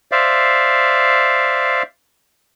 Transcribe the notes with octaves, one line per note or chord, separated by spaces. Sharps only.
C5 D5 E5 F5